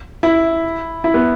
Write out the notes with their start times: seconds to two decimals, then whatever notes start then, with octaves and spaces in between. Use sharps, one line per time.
0.23 E4
1.04 E4
1.14 B3